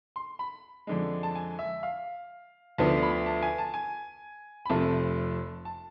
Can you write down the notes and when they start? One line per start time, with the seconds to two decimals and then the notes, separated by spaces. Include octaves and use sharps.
0.16 C6
0.39 B5
0.87 F2 D3 G#3
1.23 A5
1.35 G#5
1.59 E5
1.83 F5
2.78 D2 D3 F3 B3 A5
3.03 B5
3.26 A5
3.42 G#5
3.58 A5
3.74 G#5
4.65 B5
4.69 F1 F2 C3 F3 A3 A5
5.65 A5